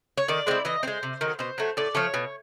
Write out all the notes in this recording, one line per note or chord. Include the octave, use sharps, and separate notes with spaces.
C#5
D#3 D5
G#3 C4 E4
E3 D#5
G#3 C4 C5
C3
D#3 F#3
B2 C5
F#3 A3
A2 D5
F3 A3 C#5
B2